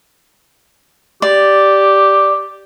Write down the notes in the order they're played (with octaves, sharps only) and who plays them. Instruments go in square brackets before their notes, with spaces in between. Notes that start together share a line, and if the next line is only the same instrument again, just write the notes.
[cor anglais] G4 [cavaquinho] D5